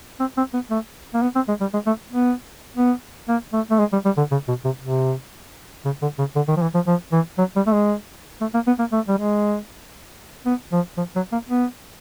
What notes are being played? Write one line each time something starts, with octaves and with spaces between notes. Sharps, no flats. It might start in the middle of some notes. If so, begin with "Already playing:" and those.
C4
C4
B3
A3
A#3
B3
C4
G#3
G3
G#3
A3
B3
B3
A#3
A3
A3
G#3
G3
G3
D3
C#3
B2
C3
C3
C#3
D3
C#3
D3
D#3
F3
E3
F3
F3
E3
F#3
G3
A3
G#3
A3
A#3
B3
A#3
A3
G3
G#3
B3
F3
F3
F#3
A#3
B3